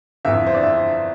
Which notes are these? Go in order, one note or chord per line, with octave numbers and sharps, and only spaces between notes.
G1 F2 E3 E5
C5
D5
E5